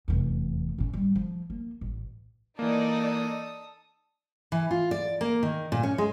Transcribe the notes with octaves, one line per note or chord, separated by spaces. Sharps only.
F1 E2
A2 C#4
G3
F3
A#3
A1
E3 A#3 D#4 A4 D5 D#6
E3
F4
D5
A#3
D#3
A#2
C#4
G#3